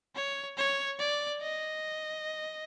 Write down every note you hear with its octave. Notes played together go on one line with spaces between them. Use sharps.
C#5
C#5
D5
D#5